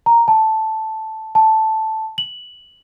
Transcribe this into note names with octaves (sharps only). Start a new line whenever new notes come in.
A#5
A5
A5
F#7